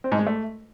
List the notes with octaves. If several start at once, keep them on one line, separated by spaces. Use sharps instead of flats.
C4
G#2
G#3
A3